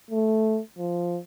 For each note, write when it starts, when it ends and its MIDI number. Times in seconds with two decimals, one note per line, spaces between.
0.10 0.59 57
0.78 1.19 53